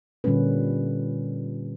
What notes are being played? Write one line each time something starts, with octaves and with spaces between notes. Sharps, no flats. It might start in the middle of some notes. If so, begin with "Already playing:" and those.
A#2 D3 G3 A#3 C#4 B4